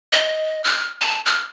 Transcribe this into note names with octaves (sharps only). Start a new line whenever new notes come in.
D#5
F6
A5
F6